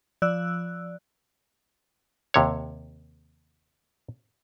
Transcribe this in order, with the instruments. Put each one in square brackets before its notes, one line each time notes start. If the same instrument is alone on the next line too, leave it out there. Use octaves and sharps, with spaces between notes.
[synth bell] F3 D5 E6 F#6
[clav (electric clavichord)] D#2 C3 C#5